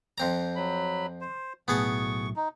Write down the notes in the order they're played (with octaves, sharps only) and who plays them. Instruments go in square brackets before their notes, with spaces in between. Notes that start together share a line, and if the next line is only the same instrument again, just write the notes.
[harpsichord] F2 C4 A#5
[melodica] F#3 B5
C5
[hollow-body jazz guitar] B1 A2 [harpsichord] B3 G#4 A5 [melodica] C#6
[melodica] D#4